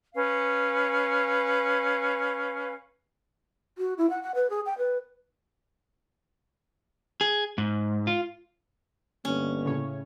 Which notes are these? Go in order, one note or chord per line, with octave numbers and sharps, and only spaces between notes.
C#4 B4 F5
F#4
E4
F#5
F#5
B4
G#4
G5
B4
G#4
G#2
F4
G1 A#3 C#4
A2 C#3 C#5